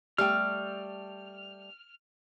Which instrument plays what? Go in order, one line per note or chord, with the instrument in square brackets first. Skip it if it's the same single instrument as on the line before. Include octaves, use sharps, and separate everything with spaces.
[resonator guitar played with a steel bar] G3 A3 G5 [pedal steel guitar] F6